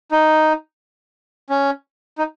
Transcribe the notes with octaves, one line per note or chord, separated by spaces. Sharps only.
D#4
C#4
D#4